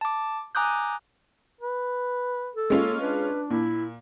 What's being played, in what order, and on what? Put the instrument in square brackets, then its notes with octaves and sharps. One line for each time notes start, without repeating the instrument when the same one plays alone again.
[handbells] A5 D6
G#5 A#5 D6 D#6 F#6 G6
[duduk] B4
[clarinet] A4
[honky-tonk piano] G#3 C#4 F4 [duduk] A#3
[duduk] D4 [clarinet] B4
[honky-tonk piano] A#2 [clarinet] E4